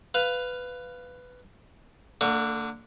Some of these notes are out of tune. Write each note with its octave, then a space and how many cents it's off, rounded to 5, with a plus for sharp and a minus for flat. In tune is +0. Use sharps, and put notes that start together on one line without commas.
B4 +10 F5 +0
D3 +0 A#3 -45 C#6 +0